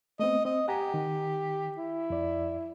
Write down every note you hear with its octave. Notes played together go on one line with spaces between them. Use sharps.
A3 B3 C4 D#5
C4 D#5
G4 F#5 G#5 A#5
D#3
E4
F2 D5